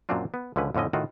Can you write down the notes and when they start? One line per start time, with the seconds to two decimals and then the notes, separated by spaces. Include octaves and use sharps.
0.09 F#2 A#2 F#3 C4 D4 F4
0.34 B3
0.56 C#2 D3 F3 C#4 B4
0.75 F2 A2 D3 C#4 D#5
0.93 A2 D#3 F4 F#4